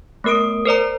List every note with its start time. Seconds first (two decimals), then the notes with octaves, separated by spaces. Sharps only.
0.24 A3 B3 A#4 D#6 D7
0.66 A#4 C5 D5 A#5